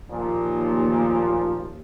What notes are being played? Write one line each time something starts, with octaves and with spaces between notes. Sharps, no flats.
D#2 A#2 F3